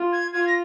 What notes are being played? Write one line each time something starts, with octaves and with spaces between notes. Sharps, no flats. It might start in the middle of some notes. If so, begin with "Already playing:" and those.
Already playing: F4
G#6
F4 G#6
A#6